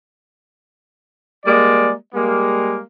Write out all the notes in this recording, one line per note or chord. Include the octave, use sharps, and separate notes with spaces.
G3 G#3 A#3 D5
G3 G#3 A#3